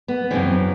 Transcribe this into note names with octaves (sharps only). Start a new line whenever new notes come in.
B3
F#2 C#3 E3 C4